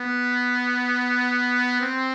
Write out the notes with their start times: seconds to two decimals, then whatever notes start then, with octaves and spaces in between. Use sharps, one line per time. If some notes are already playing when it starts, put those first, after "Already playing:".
Already playing: B3
1.81 C4